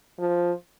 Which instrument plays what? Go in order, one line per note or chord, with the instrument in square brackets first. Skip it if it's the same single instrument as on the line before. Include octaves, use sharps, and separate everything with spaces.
[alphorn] F3